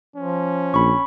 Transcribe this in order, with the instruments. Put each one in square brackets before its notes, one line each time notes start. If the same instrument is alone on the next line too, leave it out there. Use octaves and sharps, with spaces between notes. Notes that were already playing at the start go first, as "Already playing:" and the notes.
[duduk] F3 [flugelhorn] C#4
[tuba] A#1 [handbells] B5 C#6